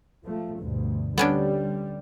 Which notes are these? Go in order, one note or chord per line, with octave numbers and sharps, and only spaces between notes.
F3 A3
D2 G2 B2
D3 G3 B3 C#4 D4